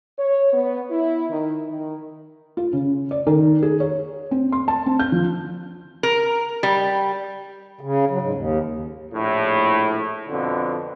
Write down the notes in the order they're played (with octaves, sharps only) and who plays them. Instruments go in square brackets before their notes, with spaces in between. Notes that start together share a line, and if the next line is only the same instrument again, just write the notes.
[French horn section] C#5
B3
E4
D#3
D#3
[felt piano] F4
C#3
D5
D#3
G#4
C#5
C4
C6
A5
C4
G6
F3
[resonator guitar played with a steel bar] A#4
G3
[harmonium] C#3
F#3
G#2
D#2
[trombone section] A#1 A2
F2 B2 D3